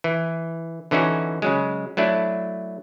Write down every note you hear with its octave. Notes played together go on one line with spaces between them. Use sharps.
E3
D3 E3 C#4 D#4 F#4
C#3 F#3 G#3
F#3 A3 D4 E4